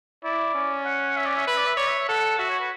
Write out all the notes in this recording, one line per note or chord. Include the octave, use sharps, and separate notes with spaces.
E4 D5
C#4
F#5
E5
D5
E5
B4 E5
D5
E5
C#5 D5
E5
E5
A4 F#5
F#4 E5
C#5
B4